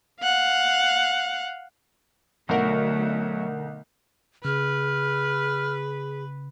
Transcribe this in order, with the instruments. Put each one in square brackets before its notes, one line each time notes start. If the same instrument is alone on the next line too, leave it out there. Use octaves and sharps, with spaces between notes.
[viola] F5 F#5
[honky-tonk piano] B1 [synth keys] D3 A#4 F#5 [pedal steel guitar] F#3 F#4 [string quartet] A3
[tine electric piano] C#3 [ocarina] G#4 [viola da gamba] B4 [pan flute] F6